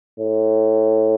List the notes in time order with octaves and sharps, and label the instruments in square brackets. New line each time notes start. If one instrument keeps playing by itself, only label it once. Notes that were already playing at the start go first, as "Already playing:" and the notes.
[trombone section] A2